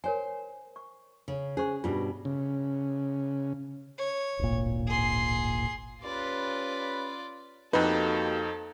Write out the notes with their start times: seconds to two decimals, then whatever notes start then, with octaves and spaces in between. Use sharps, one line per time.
0.04 A#4 C5 C#5 G#5
0.76 C#6
1.28 C#3
1.57 C#4 G#4 C5 C#6
1.84 G2 B2 F4 G4
2.25 C#3
3.98 C#5
4.39 D1 G#1 A#2
4.87 G#4 C6
6.03 C#4 F4 G4 B4 D5
7.73 F2 A#3 D#4 F#4 G4 A4 B4